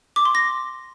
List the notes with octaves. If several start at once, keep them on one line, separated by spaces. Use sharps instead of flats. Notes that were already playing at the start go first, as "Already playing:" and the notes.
D6
C6
A#6